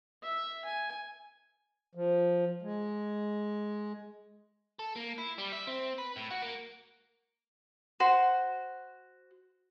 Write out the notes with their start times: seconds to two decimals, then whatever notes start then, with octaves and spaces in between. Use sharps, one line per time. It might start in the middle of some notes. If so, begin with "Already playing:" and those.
0.23 E5
0.65 G#5
1.95 F3
2.62 G#3
4.79 A4
4.96 A#3
5.18 E4
5.38 G3
5.52 E5
5.67 C4
5.98 B4
6.16 A2
6.31 F#4
6.42 A#3
8.00 F#4 C5